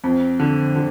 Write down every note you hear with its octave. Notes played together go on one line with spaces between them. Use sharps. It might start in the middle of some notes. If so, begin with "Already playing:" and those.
F2
D3
D3